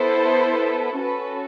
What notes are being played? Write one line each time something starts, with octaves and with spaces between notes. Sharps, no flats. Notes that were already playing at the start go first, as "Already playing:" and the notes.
Already playing: B3 E4 A4 C5
C#4 F#4 A4 B4